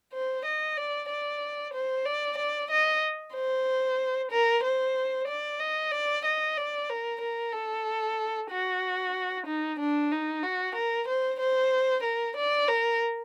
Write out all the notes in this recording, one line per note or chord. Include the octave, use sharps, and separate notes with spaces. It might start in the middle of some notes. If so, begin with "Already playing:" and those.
C5
D#5
D5
D5
C5
D5
D5
D#5
C5
A#4
C5
D5
D#5
D5
D#5
D5
A#4
A#4
A4
F#4
D#4
D4
D#4
F#4
A#4
C5
C5
A#4
D5
A#4